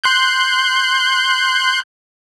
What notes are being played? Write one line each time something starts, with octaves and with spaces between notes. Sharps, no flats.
C6 F#6 G6